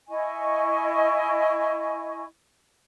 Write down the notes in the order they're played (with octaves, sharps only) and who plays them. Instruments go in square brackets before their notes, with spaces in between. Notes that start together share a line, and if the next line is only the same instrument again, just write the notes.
[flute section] E4 D#5 G#5 C#6